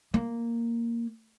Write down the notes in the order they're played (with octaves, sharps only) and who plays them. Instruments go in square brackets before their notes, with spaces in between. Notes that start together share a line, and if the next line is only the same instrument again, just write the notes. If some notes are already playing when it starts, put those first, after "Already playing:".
[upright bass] A#3